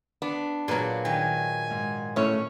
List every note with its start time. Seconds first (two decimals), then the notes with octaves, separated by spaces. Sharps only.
0.22 B3 D4
0.68 A#2 F#3 G#4 B4 A#5
1.05 D#3 G#5
1.70 G#2
2.16 A2 A3 C#4 C#5